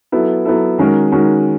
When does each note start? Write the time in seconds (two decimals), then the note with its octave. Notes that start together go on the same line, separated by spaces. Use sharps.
0.12 F#3 B3 E4 A4
0.45 F#3 B3 E4 A4
0.78 D#3 G#3 C#4 F#4 A#4
1.12 D#3 G#3 C#4 F#4 A#4